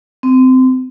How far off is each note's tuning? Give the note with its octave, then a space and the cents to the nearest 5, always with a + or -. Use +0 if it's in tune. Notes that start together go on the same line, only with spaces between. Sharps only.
C4 -20